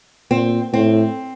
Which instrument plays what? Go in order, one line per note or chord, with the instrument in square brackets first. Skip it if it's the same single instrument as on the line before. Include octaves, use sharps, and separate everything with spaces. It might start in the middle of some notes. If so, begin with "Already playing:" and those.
[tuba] A#2 [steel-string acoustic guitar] C4
[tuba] A2 [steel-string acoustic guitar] C4